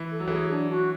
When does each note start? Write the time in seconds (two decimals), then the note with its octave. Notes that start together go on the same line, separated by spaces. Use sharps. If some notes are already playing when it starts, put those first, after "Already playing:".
Already playing: E3
0.11 A4
0.20 F#3
0.28 E3
0.31 F#3 G#4
0.50 D4
0.70 F#4